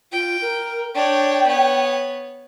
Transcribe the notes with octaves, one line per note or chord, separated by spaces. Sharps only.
F4 G5
A#4
D4 C#5 G5
B3 C#5